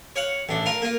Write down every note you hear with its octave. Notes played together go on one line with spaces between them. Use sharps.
C#5 F5 F#5
A1 D4
F4 A#4 F5
A#3 F4